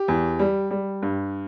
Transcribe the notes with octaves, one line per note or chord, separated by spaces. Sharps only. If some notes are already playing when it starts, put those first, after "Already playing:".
Already playing: G4
E2
G3
G3
G2